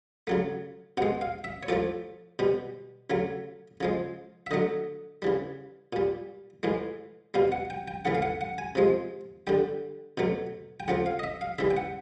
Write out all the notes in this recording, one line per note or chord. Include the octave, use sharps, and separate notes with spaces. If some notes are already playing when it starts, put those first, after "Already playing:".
C#3 F#3 A3
B2 G#3 F#5
F5
E5
C#5
A2 F3 A3 D5
B2 G3
C#3 F#3 A3
C#3 F3 G#3
E5
D3 F#3 A3 D#5
C#3 E3 G3
A#2 G3
A2 E3 G#3
B2 G3 F5
F#5
G5
G5
C#3 E3 A3 F#5
F5
F#5
F#5
G#5
C3 F3 G#3
D3 G3 G5
B2 F#3 A3
G5
C#3 F3 A3 F#5
F5
D#5
E5
F5
C#3 E3 G3 E5
G5
F#5